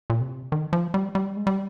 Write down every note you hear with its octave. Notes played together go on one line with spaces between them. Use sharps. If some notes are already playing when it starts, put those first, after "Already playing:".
A#2
C3
D#3
F3
G3
G3
G#3
G3